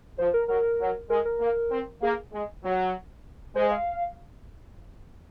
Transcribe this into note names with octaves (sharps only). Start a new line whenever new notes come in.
F3 C5
A#4
F#3 A#4
F#3
G#3 A#4
A#4
A#3
C4
A#3 G#4
G#3
F#3
G#3 C5
F5